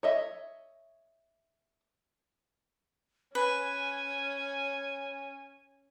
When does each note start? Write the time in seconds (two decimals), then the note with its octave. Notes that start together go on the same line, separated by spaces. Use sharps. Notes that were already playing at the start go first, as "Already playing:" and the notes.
0.03 C#5 D#5 E5
3.35 C#4 B4 G#5